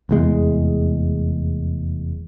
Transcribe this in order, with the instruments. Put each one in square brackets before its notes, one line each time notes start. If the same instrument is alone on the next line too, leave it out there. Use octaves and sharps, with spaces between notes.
[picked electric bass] F1 E2 G#3